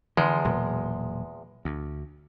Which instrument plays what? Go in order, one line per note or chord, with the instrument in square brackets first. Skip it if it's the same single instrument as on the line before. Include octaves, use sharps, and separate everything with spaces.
[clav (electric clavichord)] E2 F3 G#3 [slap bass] D3 E3
[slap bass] E1 A#2 F#3
D2